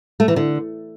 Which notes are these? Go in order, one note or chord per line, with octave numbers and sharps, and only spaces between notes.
A3
E3
D3